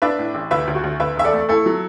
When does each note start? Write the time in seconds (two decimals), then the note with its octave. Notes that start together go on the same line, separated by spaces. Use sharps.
0.02 D4 B4 E5
0.19 A2
0.34 A1
0.51 D2 B4 E5
0.67 D2
0.75 F#4
0.84 D2
1.00 D2 B4 E5
1.17 E1 E5
1.24 A4 D5
1.33 A3
1.49 A3 E4 A4
1.66 F#3